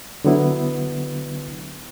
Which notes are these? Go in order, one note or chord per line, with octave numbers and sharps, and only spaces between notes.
D3 F#3 B3 E4